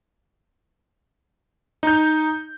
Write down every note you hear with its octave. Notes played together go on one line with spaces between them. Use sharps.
D#4 G6